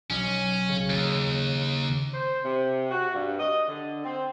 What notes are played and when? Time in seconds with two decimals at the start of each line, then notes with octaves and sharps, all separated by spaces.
0.10 B1 C#4
0.68 C#3
0.90 D#2
2.14 C5
2.44 C3
2.90 F#4
3.14 G2
3.39 D#5
3.68 D3
4.04 C4